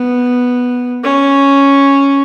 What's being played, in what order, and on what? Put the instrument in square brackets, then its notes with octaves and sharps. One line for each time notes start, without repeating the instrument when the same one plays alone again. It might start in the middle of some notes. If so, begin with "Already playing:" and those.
Already playing: [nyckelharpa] B3
C#4